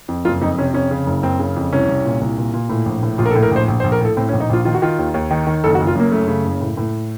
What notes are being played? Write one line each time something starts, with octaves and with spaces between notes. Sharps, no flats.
F2
F#1 F4
F2 D#4
C3 C#4
F2 C#4
C#3
F#1
F#1 C4
C#3
F2
C2 C#4
C2
A#2
C2
A#2
A#2
A2
A#1
A2
A#1 F4
A#4
A4
A2
A#4
A#1 C5
A#1
C5
A#1
A#4
A2 A4
A2 C4
C#4
A#1
D#4
A#1 F4
D#3 F4
F#4
D#3 F4
D#2
D#2
D#3
D#3
F#1 A4
F#4
F#1
F4
F#2 A#3
F#2 A3
C#3
F#1
A2
A2